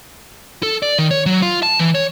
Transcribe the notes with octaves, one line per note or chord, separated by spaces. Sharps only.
A4
D5
D#3
C#5
F#3
F4
A5
E3
C#5